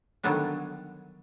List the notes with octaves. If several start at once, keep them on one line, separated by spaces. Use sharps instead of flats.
D3 D#3 F#3 G3 B3 D4